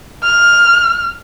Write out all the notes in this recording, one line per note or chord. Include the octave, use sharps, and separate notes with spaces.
F6